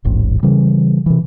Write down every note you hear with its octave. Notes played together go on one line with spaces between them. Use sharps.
D#1 A1 G#2
C#3 E3 G3
C3 E3